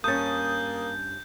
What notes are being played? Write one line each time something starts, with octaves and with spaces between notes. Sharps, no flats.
G2 A#3 C#4 D#6 G6 A6